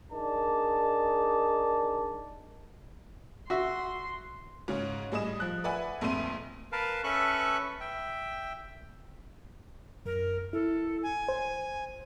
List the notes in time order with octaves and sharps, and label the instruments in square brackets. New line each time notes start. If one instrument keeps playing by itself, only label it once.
[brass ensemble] D4 D#4 G#4 A#4 D5 A5
[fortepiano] F#4 E5 [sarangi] C6
[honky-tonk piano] G#2 C#3 C#4
A2 G3 G#4 D#5 D#6 E7
F3 F#6
B4 D5 E5 F#5 G#5 B5
A#1 F2 A3 E5 C6 D#7
[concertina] A#4 B4 F5 A5
C#4 A4 B4 E5 C#6 F#6
E5 G5
[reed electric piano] F#2 [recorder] A#4
[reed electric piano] E4 [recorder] A4
[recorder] G#5
[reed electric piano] C5